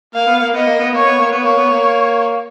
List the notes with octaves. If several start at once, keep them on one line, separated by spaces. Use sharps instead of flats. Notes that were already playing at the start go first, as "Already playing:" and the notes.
A#3 F5
B3
A#3
B3 D#5
A#3
B3
A#3 C#5
B3
A#3
B3
C#5
A#3
B3
A#3